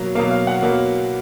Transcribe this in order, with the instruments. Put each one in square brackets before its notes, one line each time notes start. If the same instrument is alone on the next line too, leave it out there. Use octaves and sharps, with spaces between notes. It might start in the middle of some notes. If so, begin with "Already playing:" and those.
Already playing: [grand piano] B2 F#3 A#3
B2 F#3 A#3 F5
F5
F#5
B2 F#3 A#3